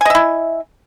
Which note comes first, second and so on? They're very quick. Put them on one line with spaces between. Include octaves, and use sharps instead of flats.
G#5 D#5 E5 E4